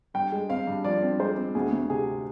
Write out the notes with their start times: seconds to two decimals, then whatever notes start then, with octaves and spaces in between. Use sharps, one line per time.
0.14 G2 G5
0.32 G#3
0.49 C4 F5
0.67 G2
0.85 F3 D5
1.02 C4
1.19 G#3 C5
1.37 C4
1.55 D2 G#4
1.73 D2
1.90 C3 G#4